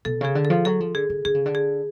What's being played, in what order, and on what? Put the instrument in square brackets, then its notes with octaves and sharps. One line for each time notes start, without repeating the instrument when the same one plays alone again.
[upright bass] B2 [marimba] A4
[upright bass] C#3 [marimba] G#4
[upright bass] D3
[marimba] A4
[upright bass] F3
[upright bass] F#3 [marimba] A4
[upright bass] F3
[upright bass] D3 [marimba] G#4
[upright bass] D3
[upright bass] D3 [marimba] G#4
[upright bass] C#3
D3
[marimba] G#4